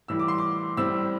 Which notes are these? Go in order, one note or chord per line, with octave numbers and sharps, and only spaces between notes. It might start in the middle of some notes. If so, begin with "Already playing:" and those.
A2 E3 G3 E6
D6
C6
D6
A2 G3 C4 E6